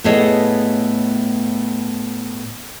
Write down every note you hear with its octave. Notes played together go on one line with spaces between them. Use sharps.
A2 B3 G#4 A4 C#5 D#5